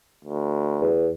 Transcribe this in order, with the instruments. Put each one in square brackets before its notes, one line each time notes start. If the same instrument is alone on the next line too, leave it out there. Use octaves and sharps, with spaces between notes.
[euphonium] D2
[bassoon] E2